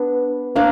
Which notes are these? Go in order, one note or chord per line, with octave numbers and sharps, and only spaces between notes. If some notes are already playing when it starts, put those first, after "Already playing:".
Already playing: B3 D4
A#3 D4